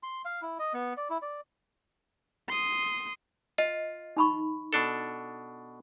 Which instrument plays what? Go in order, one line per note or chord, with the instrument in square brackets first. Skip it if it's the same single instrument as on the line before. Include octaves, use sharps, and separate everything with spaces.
[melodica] C6
F5
E4
D#5
B3
D5
E4
D5
[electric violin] C6 D#6
[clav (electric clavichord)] F4 [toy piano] D#5
[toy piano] D#4 B5 C#6
[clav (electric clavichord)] B2 D4 A4